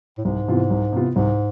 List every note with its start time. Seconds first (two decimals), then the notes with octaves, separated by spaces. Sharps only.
0.18 A2
0.25 C2 G#2
0.48 C3 E3 B3 F4
0.70 C2
0.92 C3 E3 B3 F4
1.15 C2 G#2